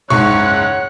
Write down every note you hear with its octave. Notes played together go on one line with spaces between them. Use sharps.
F#1 C#2 G#2 C#5 F#5 C#6 F#6